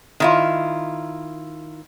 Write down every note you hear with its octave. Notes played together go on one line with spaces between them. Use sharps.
D#3 E4 F4